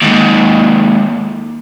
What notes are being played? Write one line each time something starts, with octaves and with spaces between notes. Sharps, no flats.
D#2 G#2